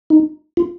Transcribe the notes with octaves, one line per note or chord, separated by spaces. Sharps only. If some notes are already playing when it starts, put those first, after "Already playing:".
D#4
F4